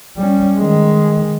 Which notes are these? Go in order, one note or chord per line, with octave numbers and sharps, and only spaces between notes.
G3 C#4
D#3 G#3